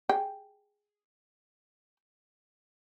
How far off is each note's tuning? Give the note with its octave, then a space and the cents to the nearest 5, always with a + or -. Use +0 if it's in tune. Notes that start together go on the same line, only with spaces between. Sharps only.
G#4 +0 G5 +0